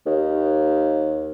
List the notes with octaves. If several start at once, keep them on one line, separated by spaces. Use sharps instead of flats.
D#2